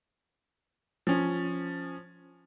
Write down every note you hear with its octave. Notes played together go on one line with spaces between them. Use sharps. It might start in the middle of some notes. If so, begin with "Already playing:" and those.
F3 C#4